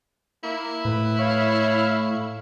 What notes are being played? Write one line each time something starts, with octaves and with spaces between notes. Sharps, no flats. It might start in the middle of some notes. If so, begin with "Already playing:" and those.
A#3 E4
A2 B4
C#5 F5